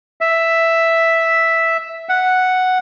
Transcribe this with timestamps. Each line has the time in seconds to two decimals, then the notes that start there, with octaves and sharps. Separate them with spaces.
0.21 E5
2.09 F#5